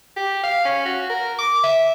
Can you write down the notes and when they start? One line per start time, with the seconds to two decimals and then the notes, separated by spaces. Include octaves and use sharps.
0.16 G4
0.44 F5
0.65 C#4
0.85 F#4
1.09 A#4
1.39 D6
1.63 E5